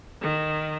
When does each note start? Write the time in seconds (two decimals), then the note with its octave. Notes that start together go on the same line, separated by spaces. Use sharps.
0.21 D#3